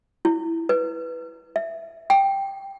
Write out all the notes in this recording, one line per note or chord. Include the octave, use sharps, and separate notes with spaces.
E4
B4
E5
G5